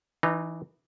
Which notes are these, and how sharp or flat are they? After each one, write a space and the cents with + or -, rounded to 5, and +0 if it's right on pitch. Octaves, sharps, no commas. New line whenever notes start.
E3 +0 D#4 -30 A#5 +0